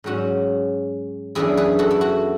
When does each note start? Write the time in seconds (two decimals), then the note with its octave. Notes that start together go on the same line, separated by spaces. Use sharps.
0.04 G#2 F#3 C#4 F#4
1.35 F#2 E3 B3 D4 E4 G#4
1.57 G#4 B4
1.79 F#4 A4
1.91 E4
2.01 F#4